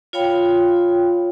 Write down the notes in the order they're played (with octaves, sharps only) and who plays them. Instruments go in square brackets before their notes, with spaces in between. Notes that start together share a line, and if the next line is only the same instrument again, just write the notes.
[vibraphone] F4 C#5 F5 G5 B5